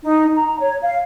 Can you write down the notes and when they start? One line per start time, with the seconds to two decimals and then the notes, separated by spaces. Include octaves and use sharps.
0.04 D#4
0.35 A#5
0.59 C#5
0.83 F5